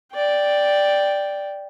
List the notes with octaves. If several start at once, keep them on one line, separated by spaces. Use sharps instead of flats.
D5 G5